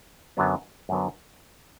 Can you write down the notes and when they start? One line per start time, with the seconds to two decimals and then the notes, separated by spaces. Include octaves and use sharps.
0.37 F#2 D3 F#3 B3
0.89 F#2 D3 F#3 B3